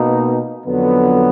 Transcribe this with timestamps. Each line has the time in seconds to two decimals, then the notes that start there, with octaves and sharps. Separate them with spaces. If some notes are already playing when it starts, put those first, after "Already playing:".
Already playing: B2 A#3 D#4
0.65 F2 D3 F#3 B3